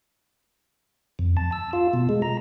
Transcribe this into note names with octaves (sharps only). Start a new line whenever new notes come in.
F2
A5
E6
F4
B2
G#3
A#5